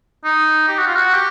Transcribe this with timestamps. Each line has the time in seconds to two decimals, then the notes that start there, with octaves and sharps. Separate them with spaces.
0.25 D#4
0.68 G4
0.79 F#4
0.87 F4
0.96 F#4
1.14 G4